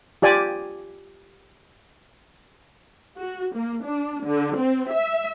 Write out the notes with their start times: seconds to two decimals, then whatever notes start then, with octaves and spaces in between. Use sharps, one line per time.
0.22 F4 G4 D5 G#5
3.19 F#4
3.56 A#3
3.85 D4
4.26 D3
4.57 C4
4.94 E5